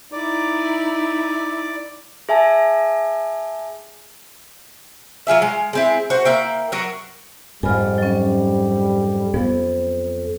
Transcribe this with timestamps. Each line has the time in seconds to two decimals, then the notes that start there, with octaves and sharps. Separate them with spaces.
0.12 D#4 E4 D5 D6
2.29 G#4 E5 G#5 A5
5.27 F#3 F4 G#4 E5
5.42 G#3
5.73 G#3 C4 E4
6.10 F#4 C5
6.25 A#3 E4 G5
6.72 F#3 F#4 A#4
7.63 F2 G#2 G3 G#5 B5 F6
7.98 F#3 C#4
9.34 F2 F3 B3